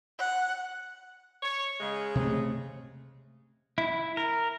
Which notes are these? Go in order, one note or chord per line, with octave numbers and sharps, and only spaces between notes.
F#5
C#5
C#3 G#3
C3 A3
E4
A#4